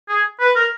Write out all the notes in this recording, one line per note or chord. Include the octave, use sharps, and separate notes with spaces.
G#4
B4
A#4